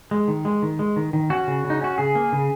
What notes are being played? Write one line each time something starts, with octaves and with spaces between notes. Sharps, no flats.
G#3
D#3
G#3
D#3
G#3
D#3
D#3
C#4 F#4
C#3
C#3
D#4
C#4 F#4
C#3 G#4
A#3
C#3